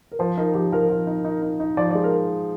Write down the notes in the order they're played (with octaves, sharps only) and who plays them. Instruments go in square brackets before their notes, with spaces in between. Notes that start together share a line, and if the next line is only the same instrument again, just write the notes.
[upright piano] A#4
[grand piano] F3 [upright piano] C5
[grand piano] D#4 [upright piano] A#4
[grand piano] F3 [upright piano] G4
[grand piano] F3 [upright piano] A#4
[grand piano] F3
D#4
D#4
D#4
D#4
[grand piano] F3 [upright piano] D5
[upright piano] D5
[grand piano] G#3
[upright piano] A#4